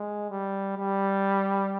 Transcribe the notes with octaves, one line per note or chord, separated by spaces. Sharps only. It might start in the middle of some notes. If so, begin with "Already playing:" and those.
Already playing: G#3
G3
G3